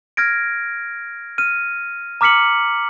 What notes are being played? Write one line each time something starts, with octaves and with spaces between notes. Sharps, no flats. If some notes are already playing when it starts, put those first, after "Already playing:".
F6 G#6 A#6 D7
F6 D#7
A#5 D6 F6 B6 C#7 F#7